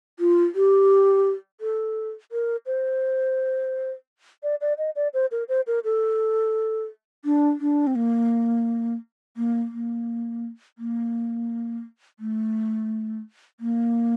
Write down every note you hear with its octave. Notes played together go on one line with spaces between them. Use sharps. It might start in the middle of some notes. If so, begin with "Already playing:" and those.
F4
G4
A4
A#4
C5
D5
D5
D#5
D5
C5
A#4
C5
A#4
A4
D4
D4
C4
A#3
A#3
A#3
A#3
A3
A#3